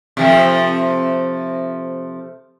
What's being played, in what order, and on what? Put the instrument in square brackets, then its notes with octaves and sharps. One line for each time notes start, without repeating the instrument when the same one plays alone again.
[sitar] C3 F3 A3